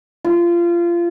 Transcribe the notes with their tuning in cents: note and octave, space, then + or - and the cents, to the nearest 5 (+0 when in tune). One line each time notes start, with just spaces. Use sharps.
F4 -25